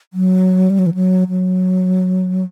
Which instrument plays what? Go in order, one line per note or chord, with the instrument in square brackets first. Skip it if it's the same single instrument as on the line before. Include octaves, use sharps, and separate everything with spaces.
[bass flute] F#3
G3
F#3
E3
F#3
F#3